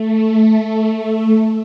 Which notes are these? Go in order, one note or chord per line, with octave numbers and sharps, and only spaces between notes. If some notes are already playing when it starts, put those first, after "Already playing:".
Already playing: A3